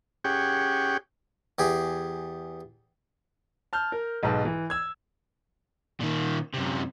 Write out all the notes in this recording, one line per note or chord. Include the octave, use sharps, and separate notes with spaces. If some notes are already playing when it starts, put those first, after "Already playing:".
C#4 G4 G#4 F#5 G5
E2 G4 G#4
A5 F6 G6
A#4
B1 G#2 B4 A5
E3
E6 G#6
A#2 D#3
F#2 C3